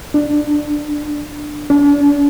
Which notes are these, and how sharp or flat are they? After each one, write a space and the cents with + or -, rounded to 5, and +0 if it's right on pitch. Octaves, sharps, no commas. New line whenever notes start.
D4 +15
D4 -40